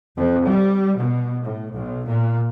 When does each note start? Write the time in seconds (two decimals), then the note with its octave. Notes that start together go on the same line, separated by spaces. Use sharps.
0.16 F2
0.47 G3
0.96 B2
1.43 A2
1.74 B1
2.08 A#2